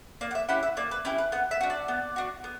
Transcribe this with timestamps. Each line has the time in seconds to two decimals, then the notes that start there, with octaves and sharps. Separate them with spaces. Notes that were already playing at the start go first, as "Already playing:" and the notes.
0.21 A#3 D5
0.31 F#5
0.35 E5
0.49 C#4 E4 G4 F#5
0.63 E5
0.77 A#3 D5
0.91 B4
1.05 C#4 E4 G4 B4
1.18 B4
1.32 B3 F#5
1.51 E5
1.61 D4 F#4
1.70 D5
1.88 B3
2.16 D4 F#4
2.44 B3